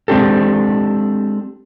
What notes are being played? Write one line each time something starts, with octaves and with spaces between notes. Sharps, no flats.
G#3 C4 D4 G4 A4